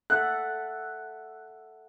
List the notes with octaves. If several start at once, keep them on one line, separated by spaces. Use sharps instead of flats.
A4 E5 F#5 F#6